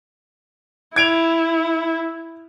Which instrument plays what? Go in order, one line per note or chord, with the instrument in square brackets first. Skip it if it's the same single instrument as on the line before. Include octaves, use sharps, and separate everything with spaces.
[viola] E4 [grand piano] G#6 D7 F7